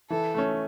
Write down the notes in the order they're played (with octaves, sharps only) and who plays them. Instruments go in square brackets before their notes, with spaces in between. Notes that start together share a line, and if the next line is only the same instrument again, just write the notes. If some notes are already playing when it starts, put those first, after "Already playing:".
[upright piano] E3 [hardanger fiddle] A4
[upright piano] A3 C#4